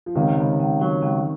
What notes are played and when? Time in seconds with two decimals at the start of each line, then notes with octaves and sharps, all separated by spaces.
0.06 F3
0.15 C#2 C3 D#3
0.38 C#2
0.60 C#2
0.81 F#3
1.03 C#2